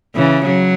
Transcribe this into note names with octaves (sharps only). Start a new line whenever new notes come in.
C#3 E3
F#3